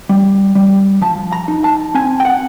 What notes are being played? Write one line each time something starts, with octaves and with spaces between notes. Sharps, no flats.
G3
G3
F3 A5
A#5
D#4
A5
C4 G#5
G5
F#5